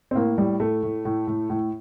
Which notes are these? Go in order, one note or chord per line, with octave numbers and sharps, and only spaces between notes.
C4
A2 A#3
A2 G3
A2 A3
A2
A2
A2
A2